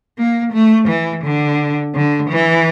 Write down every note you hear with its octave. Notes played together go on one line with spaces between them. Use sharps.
A#3
A3
E3
D3
D3
E3